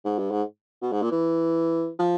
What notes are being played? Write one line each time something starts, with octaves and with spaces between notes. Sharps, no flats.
G#2
G2
G#2
B2
G#2
A#2
E3
F3